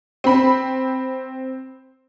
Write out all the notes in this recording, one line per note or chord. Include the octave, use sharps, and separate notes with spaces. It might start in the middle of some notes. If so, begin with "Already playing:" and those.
C4 B5